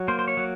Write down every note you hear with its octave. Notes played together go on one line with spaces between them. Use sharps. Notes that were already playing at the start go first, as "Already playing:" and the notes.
Already playing: F#3
A#3 C5
C5
C#5
F#3